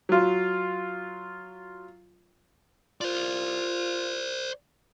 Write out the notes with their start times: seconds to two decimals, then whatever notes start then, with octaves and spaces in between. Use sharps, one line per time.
0.09 F#3 F4
3.01 F4 C5 D5